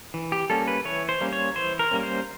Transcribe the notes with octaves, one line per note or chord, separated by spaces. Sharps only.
E3
G4
G3 A#3 C#4 A4
B4
E3 C#5
C5
G3 A#3 C#4
C#5
E3 C5
A#4
G3 A#3 C#4
C5